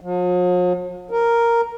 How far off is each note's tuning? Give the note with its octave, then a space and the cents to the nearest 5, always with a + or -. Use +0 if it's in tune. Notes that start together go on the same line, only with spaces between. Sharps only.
F3 +45
A#4 +0